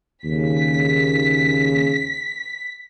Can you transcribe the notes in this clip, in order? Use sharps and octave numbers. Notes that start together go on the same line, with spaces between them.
D#2 C#3 B6